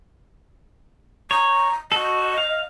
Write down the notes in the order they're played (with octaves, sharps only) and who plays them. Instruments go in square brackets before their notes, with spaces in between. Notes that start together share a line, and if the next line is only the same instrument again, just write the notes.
[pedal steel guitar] C#5 [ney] A#5
[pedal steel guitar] F#4 A4 [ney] D#5
[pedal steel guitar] F5